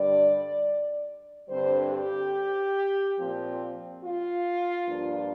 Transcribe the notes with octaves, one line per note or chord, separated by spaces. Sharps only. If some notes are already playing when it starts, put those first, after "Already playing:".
Already playing: G2 D3 G3 D5
G2 D3 G3 C4 C5
G4
A#2 F3 C4
F4
G2 F3 A#3 D4